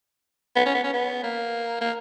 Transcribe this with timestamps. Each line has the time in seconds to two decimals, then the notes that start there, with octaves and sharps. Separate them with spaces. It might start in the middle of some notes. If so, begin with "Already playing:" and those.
0.56 B3
0.66 C#4
0.75 B3
0.84 C#4
0.93 B3
1.23 A#3
1.81 A#3